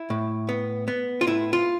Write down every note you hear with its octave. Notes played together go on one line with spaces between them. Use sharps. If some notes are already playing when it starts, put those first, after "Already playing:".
Already playing: E4
A2
B3
B3
F4
A2 E4
F4